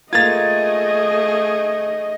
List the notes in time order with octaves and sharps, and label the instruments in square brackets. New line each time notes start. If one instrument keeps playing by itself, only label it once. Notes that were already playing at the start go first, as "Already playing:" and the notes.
[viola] A3 G#4 [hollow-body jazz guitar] A#3 F4 [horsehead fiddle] D#5 [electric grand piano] G#6 A6